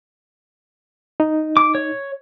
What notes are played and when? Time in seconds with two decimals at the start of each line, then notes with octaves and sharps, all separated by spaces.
1.20 D#4
1.57 D6
1.75 C#5